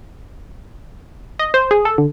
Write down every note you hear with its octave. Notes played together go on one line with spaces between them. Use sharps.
D#5
C5
G#4
A4
D3